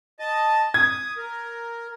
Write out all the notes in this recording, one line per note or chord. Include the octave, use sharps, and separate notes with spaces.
D#5 A5
D#6 G#6
A#4